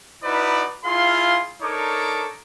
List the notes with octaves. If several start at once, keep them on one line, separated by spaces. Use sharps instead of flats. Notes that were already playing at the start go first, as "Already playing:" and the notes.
D#4 E4 F#4 B4 D5 B5
E4 F4 G#4 F5 C6
D4 D#4 A4 A#4 C#5 D6